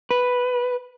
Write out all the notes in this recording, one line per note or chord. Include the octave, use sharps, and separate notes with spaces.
B4